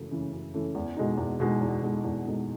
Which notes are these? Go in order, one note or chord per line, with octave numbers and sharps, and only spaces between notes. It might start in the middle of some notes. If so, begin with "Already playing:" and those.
Already playing: F#2 C#3 E3 A3
C#3 E3 A3
F#2
C#3 E3 A3
E2
B2 G#3 D#4
E2
B2 G#3 D#4
E2
B2 G#3 D#4
E2
B2 G#3 D#4